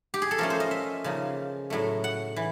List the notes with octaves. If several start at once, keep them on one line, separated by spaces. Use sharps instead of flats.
G4
G#4
A4
F3 A3 C#4 A#4
C5
D#5
E5
C#3 F3 A#3 D#4
A2 F#3 A3
F#5
E3